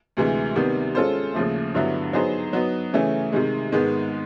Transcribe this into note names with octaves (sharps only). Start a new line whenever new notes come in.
D2 C3 E3 G#3
C3 D#3 G3 B3
G#3 C#4 F4 A4 C5
D#2 C#3 F3 A3
G2 D3 F#3 B3 E4
F#3 B3 D#4 G#4 C5
F#3 B3 D#4
C#3 E3 A3 C#4
C3 D#3 G#3
G#2 D#3 G#3 B3